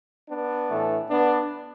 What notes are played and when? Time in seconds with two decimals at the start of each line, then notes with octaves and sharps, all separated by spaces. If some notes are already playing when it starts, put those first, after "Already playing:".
0.28 B3 D4
0.70 A2 E3 A3
1.10 B3 D4